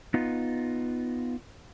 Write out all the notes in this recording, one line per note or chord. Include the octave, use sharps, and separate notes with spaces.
B3 D#4 F4